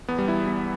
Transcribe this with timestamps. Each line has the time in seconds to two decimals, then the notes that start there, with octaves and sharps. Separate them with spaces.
0.08 E2 B3
0.18 G3
0.28 E3 E4
0.47 E2 E4